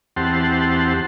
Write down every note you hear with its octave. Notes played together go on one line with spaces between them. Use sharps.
E2 C4 G4 F#5 A5 C6